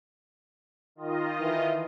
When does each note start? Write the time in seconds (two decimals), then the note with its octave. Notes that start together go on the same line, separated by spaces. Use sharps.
0.95 D#3 F4 D#5
1.40 E3